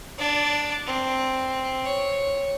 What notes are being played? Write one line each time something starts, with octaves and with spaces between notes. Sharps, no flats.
D4 D5
C4
C#5